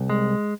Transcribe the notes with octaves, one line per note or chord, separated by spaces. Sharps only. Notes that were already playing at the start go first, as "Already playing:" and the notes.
Already playing: C2
G#3